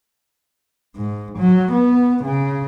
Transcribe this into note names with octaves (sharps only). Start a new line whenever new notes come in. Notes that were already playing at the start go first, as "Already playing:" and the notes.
G#2
F#3
B3
C#3